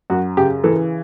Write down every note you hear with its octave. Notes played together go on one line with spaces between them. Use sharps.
F#2 F#4
C#3 G4
E3 A4